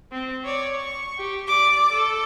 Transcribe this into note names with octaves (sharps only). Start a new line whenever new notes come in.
C4
C#5 D5
C#6
G4
D5 D6
A4